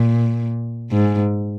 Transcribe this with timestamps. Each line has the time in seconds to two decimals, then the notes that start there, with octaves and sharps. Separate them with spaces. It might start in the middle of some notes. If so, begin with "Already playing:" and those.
Already playing: A#2
0.91 G#2